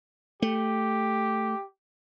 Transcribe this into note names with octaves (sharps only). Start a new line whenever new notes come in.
A3 G4